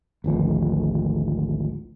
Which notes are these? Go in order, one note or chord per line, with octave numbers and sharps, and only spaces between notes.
G#1 D2 F3